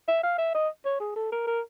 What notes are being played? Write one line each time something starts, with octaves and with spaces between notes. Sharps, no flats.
E5
F5
E5
D#5
C#5
G#4
A4
A#4
A#4